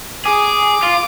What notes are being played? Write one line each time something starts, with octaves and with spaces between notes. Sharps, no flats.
G#4 D6
F4